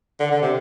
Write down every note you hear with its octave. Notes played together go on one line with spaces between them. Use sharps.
D3
D3
C3